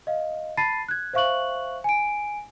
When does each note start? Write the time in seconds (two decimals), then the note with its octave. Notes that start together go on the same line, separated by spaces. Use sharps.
0.07 D#5 F5
0.57 A5 B5 A6 C7 D#7
0.89 F#6 G#6
1.13 C5 E5 F5 C#6 F#6 F#7
1.84 G#5 D7